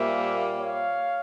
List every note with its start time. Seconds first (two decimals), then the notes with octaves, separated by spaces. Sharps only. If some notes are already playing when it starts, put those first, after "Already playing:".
Already playing: A#2 G3 A#3 C5 E5
0.61 C#5 F5